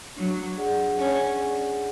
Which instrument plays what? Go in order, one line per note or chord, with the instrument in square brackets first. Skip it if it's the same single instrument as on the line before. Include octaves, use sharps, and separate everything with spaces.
[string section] F#3 [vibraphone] D4
[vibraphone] G#4 D5 F#5
[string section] C#4 [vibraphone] D4
[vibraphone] G#4 D5 F#5